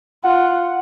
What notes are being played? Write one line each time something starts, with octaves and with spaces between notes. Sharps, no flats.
F4 F#5